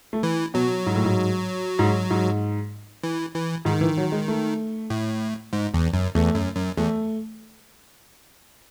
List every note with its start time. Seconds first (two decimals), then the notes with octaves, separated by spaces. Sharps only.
0.13 A3
0.23 E3
0.54 B2 F#3
0.86 G#2
0.95 A2
1.05 G#2
1.79 G#2
2.10 G#2
3.04 E3
3.34 E3
3.65 G#2 D#3
3.81 E3
3.97 F#3
4.12 G#3
4.28 A3
4.90 A2
5.53 G#2
5.74 E2
5.94 F#2
6.15 E2 A3
6.35 F#2
6.56 F#2
6.77 E2 A3